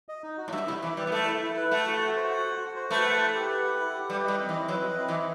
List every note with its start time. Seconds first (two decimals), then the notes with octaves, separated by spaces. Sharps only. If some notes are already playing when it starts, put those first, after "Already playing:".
0.09 D#5
0.23 D#4
0.38 F#4
0.48 A2
0.52 G2 E5
0.67 C3 E4
0.82 E3 E4
0.97 G3 B4
1.07 B3
1.12 A3 E5
1.27 E4
1.42 E4
1.57 B4
1.71 A3 F#5
1.86 F#4
2.01 F#4
2.16 C5
2.31 F#5
2.46 F#4
2.61 F#4
2.76 C5
2.90 A3 B4
3.06 F#5
3.19 E4
3.35 G4
3.49 B4
3.64 F#5
3.79 E4
3.94 G4
4.09 G3 B4
4.24 G3 D#5
4.39 C4
4.49 E3
4.53 E4
4.68 F#3 B4
4.83 D#5
4.98 C4
5.08 E3
5.12 E4